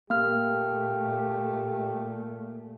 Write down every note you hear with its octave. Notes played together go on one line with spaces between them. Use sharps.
A#2 A3 A#3 G4 F6